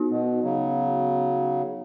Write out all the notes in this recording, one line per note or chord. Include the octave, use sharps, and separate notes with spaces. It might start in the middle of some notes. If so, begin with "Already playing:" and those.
Already playing: B3 D#4 F#4
B2
C#3 F#3